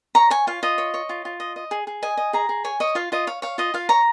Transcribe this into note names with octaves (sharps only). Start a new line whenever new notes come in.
C#5 A#5
C#5 G#5
F4 F5
F4 D#5
C#5
C#5
F4
F4
D#5
D#5
G#4
G#4
D#5 G#5
D#5
G#4 A#5
G#4
C#5 G#5
C#5 D#5
F4 F5
F4 D#5
C#5 F5
C#5 F5
F4 D#5
F4 F5
C#5 A#5